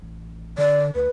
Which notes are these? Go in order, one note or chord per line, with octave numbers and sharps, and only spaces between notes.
A1
D3 D5
D2 B4